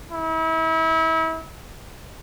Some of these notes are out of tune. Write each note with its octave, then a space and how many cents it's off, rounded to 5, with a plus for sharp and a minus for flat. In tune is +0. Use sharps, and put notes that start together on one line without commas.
E4 -35